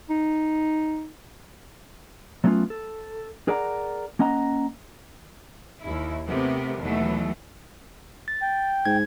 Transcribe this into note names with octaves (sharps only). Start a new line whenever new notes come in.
D#4
F#3 A3 B3 C#4 F4
A4
G#4 A#4 D5 F#5 A#5
A#3 C#4 D#5 F#5 A#5
D#2 E4
C3 A3 B3 G4 A#4
D#2 B2 E3 F#3 A3
A6
G5
G#2 G#6